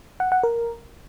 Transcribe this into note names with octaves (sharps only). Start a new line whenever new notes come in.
F#5
F#5
A#4